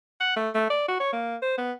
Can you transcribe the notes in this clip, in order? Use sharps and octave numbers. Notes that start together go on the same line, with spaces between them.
F#5
A3
A3
D5
F#4
C#5
A#3
C5
B3